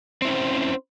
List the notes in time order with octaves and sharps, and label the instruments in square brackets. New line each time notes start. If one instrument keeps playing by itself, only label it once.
[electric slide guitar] C4
E4
C#4
C5